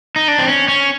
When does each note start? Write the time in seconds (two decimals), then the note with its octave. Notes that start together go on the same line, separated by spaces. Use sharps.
0.16 D#4
0.28 D4
0.38 C4
0.48 C#4
0.68 C#4